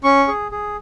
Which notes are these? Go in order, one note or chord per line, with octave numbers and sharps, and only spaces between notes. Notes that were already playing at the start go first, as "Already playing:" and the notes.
C#4 C#6
G#4
G#4